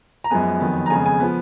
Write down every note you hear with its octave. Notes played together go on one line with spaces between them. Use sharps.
A#5
F#2 F3 G#3 B3 G#5
F2 D#3 F#3 B3
A#5
F2 C#3 G#3 B3 G#5
G#5
F3 B3